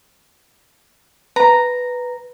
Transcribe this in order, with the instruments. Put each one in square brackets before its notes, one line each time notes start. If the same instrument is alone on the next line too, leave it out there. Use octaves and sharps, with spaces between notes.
[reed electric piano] B4 [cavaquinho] A#5